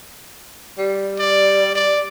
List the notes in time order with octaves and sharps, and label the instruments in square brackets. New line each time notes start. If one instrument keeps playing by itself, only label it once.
[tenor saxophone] G3
[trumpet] D5
D5